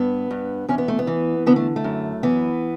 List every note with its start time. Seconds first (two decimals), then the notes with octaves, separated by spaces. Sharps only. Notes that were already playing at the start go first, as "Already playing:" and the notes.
Already playing: G2 B3
0.31 G2
0.69 E2 C#4
0.78 B3
0.88 A3
0.99 B3
1.07 E3
1.46 D3 B3
1.56 A3
1.76 A3
1.84 F#2
2.23 E3 B3